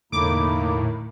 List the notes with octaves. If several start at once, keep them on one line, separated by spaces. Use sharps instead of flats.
E1 A2 D3 A#3 D#4 E4 D6